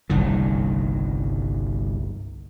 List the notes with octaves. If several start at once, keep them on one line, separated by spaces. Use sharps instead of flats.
G1 C2 D#3